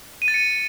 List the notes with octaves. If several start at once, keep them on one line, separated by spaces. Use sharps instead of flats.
D#7
A6
C#7